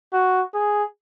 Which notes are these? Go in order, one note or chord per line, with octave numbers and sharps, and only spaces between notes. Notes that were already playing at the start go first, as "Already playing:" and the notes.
F#4
G#4